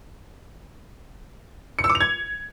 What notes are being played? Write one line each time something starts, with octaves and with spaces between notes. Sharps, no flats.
C#7
E6
D6
F7
G#6